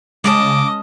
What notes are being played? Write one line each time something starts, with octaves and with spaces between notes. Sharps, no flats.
C#3 G#3 C#4 D#5 A5 D6